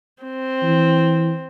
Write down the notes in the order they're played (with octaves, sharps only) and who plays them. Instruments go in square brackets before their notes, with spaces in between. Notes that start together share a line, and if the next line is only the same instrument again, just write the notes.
[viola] C4
[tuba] E3